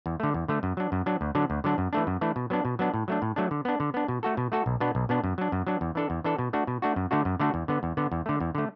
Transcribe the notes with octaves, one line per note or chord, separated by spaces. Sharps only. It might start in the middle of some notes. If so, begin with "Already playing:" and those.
E2
D3 A3
E2
D3 A3
F#2
F#3 D4
F#2
F#3 D4
D2
D3 F#3 D4
D2
D3 F#3 D4
F#2
E3 A3 D4
F#2
E3 A3 D4
B2
F#3 B3 D4
B2
F#3 B3 D4
A2
F#3 A3 D4
A2
F#3 A3 D4
D3
B3 D4
D3
B3 D4
B2
A3 F#4 A4
B2
A3 F#4 A4
B1
B2 B3 D4
B1
B2 B3 D4
F#2
F#3 D4
F#2
F#3 D4
E2
E3 D4 A4
E2
E3 D4 A4
B2
A3 D4 F#4
B2
A3 D4 F#4
F#2
D3 A3 D4 F#4
F#2
D3 A3 D4 F#4
E2
D3 B3
E2
D3 B3
E2
D3 A3
E2
D3 A3